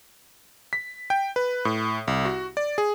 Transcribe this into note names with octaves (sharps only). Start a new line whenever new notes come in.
B6
G5
B4
A2
C2
F#4
D5
G#4